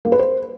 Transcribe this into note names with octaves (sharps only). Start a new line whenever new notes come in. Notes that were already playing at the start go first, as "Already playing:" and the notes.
A#3
B4
C5